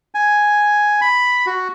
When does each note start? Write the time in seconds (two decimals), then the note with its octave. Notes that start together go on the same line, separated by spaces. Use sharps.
0.15 G#5
1.01 B5
1.46 F#4